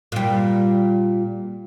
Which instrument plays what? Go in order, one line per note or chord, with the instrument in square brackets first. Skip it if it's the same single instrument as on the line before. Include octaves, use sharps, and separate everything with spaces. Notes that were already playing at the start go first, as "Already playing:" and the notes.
[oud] A#2 G3